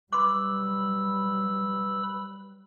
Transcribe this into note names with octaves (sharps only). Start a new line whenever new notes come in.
F#3 G3 B4 B5 C6 D6 E6